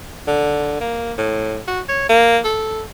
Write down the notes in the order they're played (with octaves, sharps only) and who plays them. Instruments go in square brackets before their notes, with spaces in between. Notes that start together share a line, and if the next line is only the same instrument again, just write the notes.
[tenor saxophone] D3
A#3
A2
F#4
C#5
A#3
A4